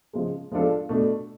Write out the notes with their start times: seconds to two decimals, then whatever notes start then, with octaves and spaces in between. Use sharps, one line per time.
0.13 C#3 F3 G#3
0.52 F3 G#3 D4 F4 A4
0.89 B2 A3 D4